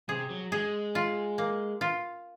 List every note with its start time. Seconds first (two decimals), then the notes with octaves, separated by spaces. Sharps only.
0.09 C3 G#4
0.30 F#3
0.52 G#3 G#4
0.95 F4
1.38 A#3
1.81 F4